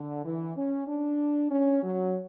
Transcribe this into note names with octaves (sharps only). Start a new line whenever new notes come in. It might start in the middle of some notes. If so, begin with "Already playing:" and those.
Already playing: D3
E3
C#4
D4
C#4
F#3